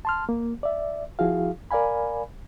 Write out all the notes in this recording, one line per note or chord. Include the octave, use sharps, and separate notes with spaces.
A5 C6 F6
A#3
D5 E5
F3 E4 F#4 G#4 F5
A#4 D5 F5 G#5 B5